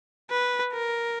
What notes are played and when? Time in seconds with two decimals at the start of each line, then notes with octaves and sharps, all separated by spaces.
0.31 B4
0.73 A#4